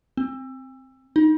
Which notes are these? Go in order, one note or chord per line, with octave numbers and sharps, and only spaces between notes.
C4
D#4